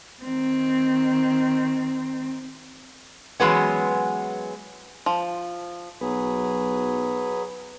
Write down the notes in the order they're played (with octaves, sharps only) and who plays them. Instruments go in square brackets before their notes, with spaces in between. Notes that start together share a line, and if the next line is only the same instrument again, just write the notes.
[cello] D#3 C4
[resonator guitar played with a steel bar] E3 F#3 G#3 B3 C#4
[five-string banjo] F3
[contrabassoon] B1 [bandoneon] F#3 G#4 [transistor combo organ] B4